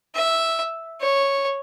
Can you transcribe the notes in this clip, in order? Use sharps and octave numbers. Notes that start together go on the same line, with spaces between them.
E5
C#5